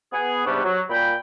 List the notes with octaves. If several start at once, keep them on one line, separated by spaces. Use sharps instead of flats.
B3 G#4
G#2 C3 G3 B3 D4 C#6
F#3
A#2 G5 B5